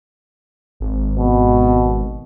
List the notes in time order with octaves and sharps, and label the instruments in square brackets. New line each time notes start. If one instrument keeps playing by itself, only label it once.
[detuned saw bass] G#1
[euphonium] B2